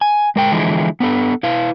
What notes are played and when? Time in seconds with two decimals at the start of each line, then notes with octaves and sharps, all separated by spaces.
0.01 G#5
0.36 G#3 A#4 G5
0.51 D3 E3 F3 G#3 E4
1.00 B3 D4 A4
1.43 E4 B4 F5